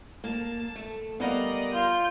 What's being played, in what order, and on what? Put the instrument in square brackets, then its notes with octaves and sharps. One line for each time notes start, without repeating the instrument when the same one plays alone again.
[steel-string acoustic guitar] A#3 [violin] A5
[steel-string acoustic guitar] A3
[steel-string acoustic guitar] G3 A#4 F5 [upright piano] B3 [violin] D5 D#5
[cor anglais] F4 [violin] G6